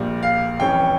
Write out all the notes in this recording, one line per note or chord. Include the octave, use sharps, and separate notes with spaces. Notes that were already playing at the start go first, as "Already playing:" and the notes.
Already playing: A#1 A#2 G3
F5
F1 F2 E3 G3 C#4 G5